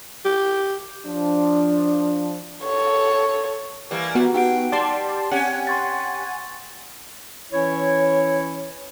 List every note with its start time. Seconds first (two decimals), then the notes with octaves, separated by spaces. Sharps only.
0.25 G4
1.06 F3 D4
2.64 A4 C#5
3.91 E3 G3 A#3
4.15 B3 F#4
4.34 D#4 G4 F#5 D7
4.72 G3 D5 A5 C6
5.31 C4 C#4 G4 F#5 G#5
5.67 C6 C#6 A6
7.52 E3 C#4 E4 C#5